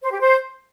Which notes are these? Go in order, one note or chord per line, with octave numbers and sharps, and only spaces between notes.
C5
G4
C5